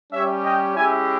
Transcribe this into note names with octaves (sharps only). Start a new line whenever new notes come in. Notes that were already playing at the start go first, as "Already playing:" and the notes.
G3 C#4 G4 C#5 E5
D#5 G5
G#3 C#4 E4 G4 E5 G#5